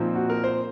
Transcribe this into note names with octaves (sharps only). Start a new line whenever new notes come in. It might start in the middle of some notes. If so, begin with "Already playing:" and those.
Already playing: A#2 F3 C4 D#4
F#4
A#4
C5